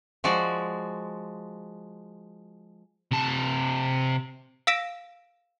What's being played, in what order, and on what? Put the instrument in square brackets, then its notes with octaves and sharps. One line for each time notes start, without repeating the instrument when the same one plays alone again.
[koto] F3 G#3 F#4 D5
[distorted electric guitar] C3 A5
[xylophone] F5 E6 A#6 B6 D7 E7